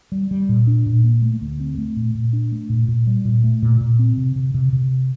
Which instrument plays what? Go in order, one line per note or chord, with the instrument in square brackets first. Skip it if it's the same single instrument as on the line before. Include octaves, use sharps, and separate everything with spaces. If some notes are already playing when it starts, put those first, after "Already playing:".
[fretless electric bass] G3
G3
A#2
D4
A#2
A#3
A3
D2
C4
A3
A#2
A#2
D4
A3
A#2
A#2
G3
A#2
A3
A#2
A#2
C4
C3
C3
C3
C3